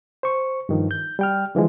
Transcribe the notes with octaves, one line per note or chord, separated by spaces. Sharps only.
C5 C#6
G2 D#3 F3
G6
G3 G5 F6
D3 E3 F3 G#3